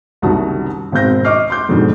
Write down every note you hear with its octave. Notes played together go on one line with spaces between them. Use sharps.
F#1 C2 D#3 F#4 A5 D#6
G#1 B2 C4 G6 A#6
D#5 C#6 D6 F6 C7
C6 D6 G6
F2 G#2 B2 D3 D#3